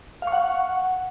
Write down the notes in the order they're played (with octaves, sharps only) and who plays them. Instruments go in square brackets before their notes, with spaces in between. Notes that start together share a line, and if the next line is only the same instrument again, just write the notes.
[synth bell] F5
C#6
F#5